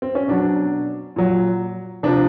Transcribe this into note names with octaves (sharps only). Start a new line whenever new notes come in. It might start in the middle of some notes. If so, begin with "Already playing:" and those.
C4
C#4
B2 F#3 D4
A#2 F#3
C3 F3 D4